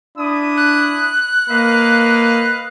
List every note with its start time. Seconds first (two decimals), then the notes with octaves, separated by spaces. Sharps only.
0.18 D4 E4 D#6
0.57 F#6
1.50 A#3 B4 D#5 F5